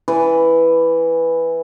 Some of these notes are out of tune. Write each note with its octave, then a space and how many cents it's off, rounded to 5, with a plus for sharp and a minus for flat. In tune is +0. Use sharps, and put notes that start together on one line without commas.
E3 +0 B4 +5 D5 +0